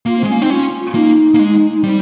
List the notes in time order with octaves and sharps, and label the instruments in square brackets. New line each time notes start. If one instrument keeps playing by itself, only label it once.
[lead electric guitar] A#3 [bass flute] F4
[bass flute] C4
[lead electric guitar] G#3
[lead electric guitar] A#3 [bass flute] C#4
[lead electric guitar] C4 [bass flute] D#4
[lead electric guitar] C#4 [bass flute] F4
[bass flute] F4
[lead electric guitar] A#3 [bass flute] D#4
[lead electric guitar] A#3
G#3
[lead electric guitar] G3 [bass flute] C4